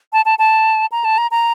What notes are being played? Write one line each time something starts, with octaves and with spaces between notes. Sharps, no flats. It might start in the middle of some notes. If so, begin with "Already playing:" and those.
A5
A5
A5
A#5
A5
A#5
A#5